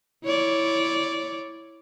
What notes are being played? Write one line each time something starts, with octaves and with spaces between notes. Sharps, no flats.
E4 C#5 D5